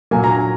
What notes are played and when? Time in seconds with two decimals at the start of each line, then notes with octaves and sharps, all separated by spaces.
0.11 A#2 F#3 A#3 G#5
0.24 A#5
0.36 G#5